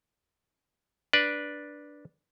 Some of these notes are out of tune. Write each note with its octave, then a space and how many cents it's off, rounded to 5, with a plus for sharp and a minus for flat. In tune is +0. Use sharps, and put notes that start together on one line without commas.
D4 +0 B4 -15 D5 +0